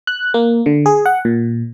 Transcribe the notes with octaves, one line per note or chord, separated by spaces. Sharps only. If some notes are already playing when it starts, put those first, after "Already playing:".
F#6
A#3
D3
G#4
F#5
A#2